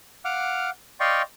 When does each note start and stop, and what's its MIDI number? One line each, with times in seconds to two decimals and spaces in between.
0.25 0.70 77
0.25 0.70 78
0.25 0.70 86
0.25 0.70 89
1.00 1.22 74
1.00 1.22 75
1.00 1.22 77
1.00 1.22 79
1.00 1.22 84
1.00 1.22 85